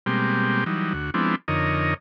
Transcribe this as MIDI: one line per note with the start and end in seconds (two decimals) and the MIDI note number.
0.06 0.64 47
0.06 0.64 55
0.06 0.64 56
0.06 0.64 58
0.06 0.64 60
0.06 0.64 67
0.66 0.93 52
0.66 0.93 54
0.66 0.93 55
0.66 0.93 63
0.94 1.11 38
0.94 1.11 66
1.14 1.35 53
1.14 1.35 56
1.14 1.35 59
1.14 1.35 60
1.14 1.35 62
1.14 1.35 64
1.48 1.94 41
1.48 1.94 50
1.48 1.94 63
1.48 1.94 70
1.48 1.94 73
1.48 1.94 75